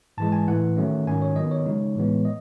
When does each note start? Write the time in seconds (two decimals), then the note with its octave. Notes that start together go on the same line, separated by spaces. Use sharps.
0.18 G#2 E3 G#3 A5
0.32 G#5
0.47 A2 E3 A3 F#5
0.77 D#3 F#3 A3 C#4
1.07 G#2 D#3 F#3 C#4 G#5
1.22 C#5
1.36 D#3 F#3 B3 D#5
1.51 C#5
1.66 C#3 G#3 D#4
1.96 A2 E3 G#3 B3
2.25 D#5